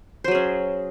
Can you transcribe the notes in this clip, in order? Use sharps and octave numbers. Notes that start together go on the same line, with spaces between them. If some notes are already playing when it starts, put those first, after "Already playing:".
F#3 C#4 G#4 C5